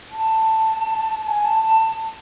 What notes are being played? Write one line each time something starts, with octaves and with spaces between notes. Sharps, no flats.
A5
G#5
A5
A5